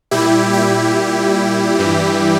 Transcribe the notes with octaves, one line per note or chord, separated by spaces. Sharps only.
A#2 G3 E4 G4
E4 G4
G2 E3 G3